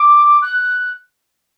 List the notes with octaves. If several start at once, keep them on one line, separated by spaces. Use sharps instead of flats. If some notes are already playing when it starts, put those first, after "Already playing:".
Already playing: D6
F#6